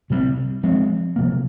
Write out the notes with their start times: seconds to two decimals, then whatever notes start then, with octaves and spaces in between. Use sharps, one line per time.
0.10 C3 G3 C4
0.63 F3 G#3 C4
1.16 C3 F3 A#3